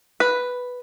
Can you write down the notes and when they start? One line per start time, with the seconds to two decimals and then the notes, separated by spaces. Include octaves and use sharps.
0.20 B4